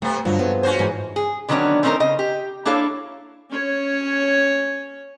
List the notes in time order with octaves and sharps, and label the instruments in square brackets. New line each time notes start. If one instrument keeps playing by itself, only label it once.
[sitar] C3 B3 [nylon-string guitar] A3
[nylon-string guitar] G2 D3 [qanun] F3 [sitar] F#3
[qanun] A3 C4 G#4 [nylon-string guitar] B3
[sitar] C#4 F#4 C5
[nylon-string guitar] G#2 E3 [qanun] D#4 D#5
[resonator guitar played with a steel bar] G#4
D3 D#3 F#3 B3 C#4 D4
A3 C4 C#4 D#4 A4 A#4
C#3 D#5
G4
A#3 D4 E4 A4 C#5 F5
[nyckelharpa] C#4 C#5